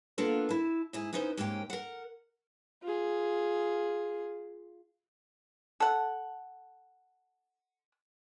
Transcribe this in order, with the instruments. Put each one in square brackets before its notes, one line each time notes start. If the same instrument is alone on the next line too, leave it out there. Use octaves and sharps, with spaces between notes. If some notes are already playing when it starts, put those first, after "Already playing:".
[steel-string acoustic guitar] A#3 B3 D4 F4 A4 A#4
E4 A5
G#2 E4 G#4
B3 C#4 D#4 E4 C5
G#2 A#3 C#4 G4 G5
A#4 F#5
[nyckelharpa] F4 G#4
[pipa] A4 F#5